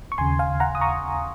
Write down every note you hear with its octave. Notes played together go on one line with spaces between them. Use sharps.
C#6
D#2 C#3 G#5 C6
F5 G#5
F#5 A#5
D#6
A#5 C#6